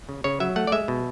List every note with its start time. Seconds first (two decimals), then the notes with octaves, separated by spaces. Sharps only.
0.09 C#3
0.24 C#3 C#5
0.40 F#3 E5
0.56 A3 F#5
0.67 D5
0.72 G#3 E5
0.88 B2